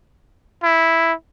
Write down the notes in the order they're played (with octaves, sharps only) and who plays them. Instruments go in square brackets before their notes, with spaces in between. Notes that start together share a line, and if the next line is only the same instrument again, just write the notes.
[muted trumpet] E4